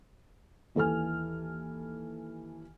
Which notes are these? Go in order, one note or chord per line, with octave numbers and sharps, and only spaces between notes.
D#2 E3 A4 G#5 F6